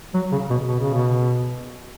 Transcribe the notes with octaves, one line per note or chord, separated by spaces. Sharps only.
F#3
C#3
B2
B2
C#3
B2